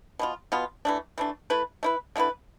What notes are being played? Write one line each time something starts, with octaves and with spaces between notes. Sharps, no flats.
B2 B3 F4
B2 B3 F4
E3 A3 D4
E3 A3 D4
A3 E4 B4
A3 E4 B4
D3 A3 E4 B4